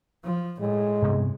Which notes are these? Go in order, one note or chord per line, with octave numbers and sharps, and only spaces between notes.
F3
A2 G#3
G2 C3 B3